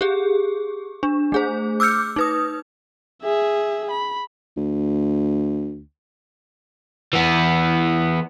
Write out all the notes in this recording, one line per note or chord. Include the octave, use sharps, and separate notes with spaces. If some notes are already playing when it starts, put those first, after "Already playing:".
G4 G#4
D4
A3 G#4 C5
D6 E6 F6 G6 C#7
D#4 B4 D#6
G#4 E5
B5
D2
E3 B3